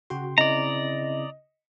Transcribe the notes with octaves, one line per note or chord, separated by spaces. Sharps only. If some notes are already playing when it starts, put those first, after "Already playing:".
C#3 F#4 G5 C6
C#3 C4 E4 D5 D#5 A#5